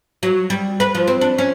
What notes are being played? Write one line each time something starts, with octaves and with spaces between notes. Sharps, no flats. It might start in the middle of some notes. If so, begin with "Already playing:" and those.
F#3
G3
B4
F3
C4
D4
C#4